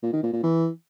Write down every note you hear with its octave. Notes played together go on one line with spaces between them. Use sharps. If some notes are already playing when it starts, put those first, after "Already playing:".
A#2
D#3
A#2
A#2
E3